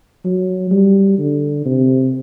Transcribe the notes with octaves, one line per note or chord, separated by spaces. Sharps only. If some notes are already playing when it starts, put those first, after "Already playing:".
F#3
G3
D3
C3